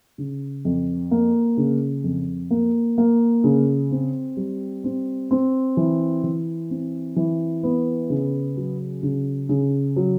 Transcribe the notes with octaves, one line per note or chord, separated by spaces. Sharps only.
C#3
F2
A#3
C#3
F2
A#3
A#3
C#3
C4
G3
C4
C4
E3
E3
C4
E3
B3
C#3
F#3
C#3
C#3
F#3